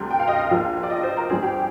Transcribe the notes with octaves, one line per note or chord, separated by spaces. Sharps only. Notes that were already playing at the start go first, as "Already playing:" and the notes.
Already playing: D2 C3 G3
G5
F5
D#5
F5
A#1 A#2 F3
D5
D#5
C5
A#4
G1 G2 F3 C4 G#4
G4